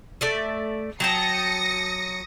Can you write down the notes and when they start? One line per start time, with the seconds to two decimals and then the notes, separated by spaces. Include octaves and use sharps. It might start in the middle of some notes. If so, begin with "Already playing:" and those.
0.21 A3 D5 E5
1.00 F#3 G5 A5 D#6 A#6 C#7